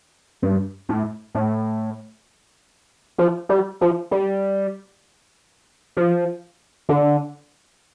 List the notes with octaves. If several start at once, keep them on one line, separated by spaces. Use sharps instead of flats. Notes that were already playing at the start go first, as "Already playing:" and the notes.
G2
A2
A2
F3
G3
F3
G3
F3
D3